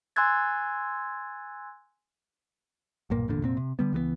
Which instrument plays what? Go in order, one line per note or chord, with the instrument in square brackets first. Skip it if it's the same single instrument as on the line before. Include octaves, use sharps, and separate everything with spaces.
[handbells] G#5 C6 E6 F#6 G#6 A6
[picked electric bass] B1 G2 A#2 A#3
G#1 E2 A#2 D3
F1 A#2 C4
C3
D3 G3 B3
C#2 E3 G#3 B3